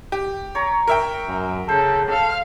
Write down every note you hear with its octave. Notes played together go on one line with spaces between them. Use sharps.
G4
C#5 A#5
A#4 E5 G5
F#2
C#3 A4 C5
A4 F5